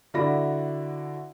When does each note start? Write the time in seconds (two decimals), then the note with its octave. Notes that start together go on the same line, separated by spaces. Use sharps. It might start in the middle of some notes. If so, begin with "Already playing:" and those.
0.14 D3 E4 F#4 D5 B5 A#6